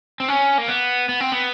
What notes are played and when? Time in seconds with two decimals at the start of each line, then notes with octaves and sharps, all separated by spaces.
0.20 C4
0.28 C#4
0.58 A#3
0.68 B3
1.09 B3
1.20 C4
1.32 B3